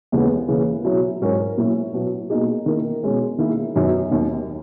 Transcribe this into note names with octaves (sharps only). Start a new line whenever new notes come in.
D#2 C#3 E3 G#3 B3
C#3 E3 A#3
B2 F#3 C#4 E4
G#2 F#3 C#4 F#4 A#4
A#2 F#3 C#4 E4
B2 F#3 B3 E4
B2 A#3 D#4 G#4
D#3 A#3 E4 A#4
B2 G#3 C#4
D#3 A#3 E4 G#4
F#2 D#3 F#3 B3
D#2 D#3 A#3